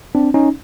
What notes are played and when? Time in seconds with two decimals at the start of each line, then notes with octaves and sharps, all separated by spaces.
0.15 C4 D4
0.34 C#4 D#4